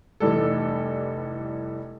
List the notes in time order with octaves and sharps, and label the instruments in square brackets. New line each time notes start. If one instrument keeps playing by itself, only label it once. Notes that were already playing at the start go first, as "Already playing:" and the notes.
[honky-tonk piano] F1 E3 G3 A4